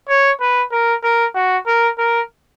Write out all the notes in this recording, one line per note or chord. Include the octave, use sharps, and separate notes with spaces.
C#5
B4
A#4
A#4
F#4
A#4
A#4